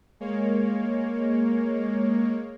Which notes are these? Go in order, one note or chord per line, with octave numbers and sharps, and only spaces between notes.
G#3 A#3 C#5